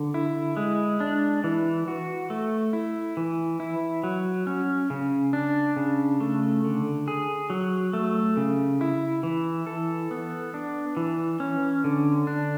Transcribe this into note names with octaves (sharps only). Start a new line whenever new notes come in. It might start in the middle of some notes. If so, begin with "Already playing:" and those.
Already playing: D3
E4
G#3
D4
E3
F#4
A3
E4
E3
E4
F#3
C#4
C#3
D4
C#3
A3
D3
G#4
F#3
A3
C#3
E4
E3
A4
B3
D4
E3
C#4
D3
D4